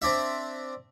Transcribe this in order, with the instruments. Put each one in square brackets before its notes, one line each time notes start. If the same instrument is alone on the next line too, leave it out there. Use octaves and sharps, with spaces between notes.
[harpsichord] C4 D4 E5